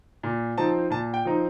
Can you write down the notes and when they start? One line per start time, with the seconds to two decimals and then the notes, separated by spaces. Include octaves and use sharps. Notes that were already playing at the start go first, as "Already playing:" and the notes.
0.23 A#2
0.58 F3 C4 D#4 A5
0.90 A#2 A5
1.14 G5
1.25 F3 C4 D#4